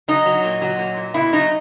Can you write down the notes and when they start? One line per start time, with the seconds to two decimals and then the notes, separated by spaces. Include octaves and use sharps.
0.08 F#3 D#4
0.26 F#3
0.44 A#2
0.62 F#3
0.79 A#2
0.97 A#2
1.14 B2 E4
1.33 F#3 D#4